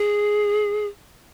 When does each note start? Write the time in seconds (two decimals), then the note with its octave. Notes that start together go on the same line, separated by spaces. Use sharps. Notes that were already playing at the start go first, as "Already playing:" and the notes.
Already playing: G#4